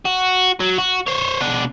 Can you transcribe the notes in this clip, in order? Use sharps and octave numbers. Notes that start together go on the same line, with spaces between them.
F#4
F#3
F#4
C5 C#5
B2 D4